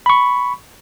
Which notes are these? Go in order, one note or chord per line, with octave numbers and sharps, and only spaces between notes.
B5 C#6